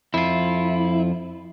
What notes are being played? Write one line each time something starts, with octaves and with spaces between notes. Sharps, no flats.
F2 E4 F4